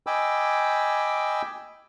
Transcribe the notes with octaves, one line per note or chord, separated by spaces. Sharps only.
D#5 G5 G#5 B5 D6 E6